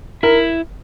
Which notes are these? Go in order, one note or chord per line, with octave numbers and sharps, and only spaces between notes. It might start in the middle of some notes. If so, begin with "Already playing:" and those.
E4 A#4